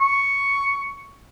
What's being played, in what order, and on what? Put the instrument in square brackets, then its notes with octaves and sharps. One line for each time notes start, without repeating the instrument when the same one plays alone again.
[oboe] C#6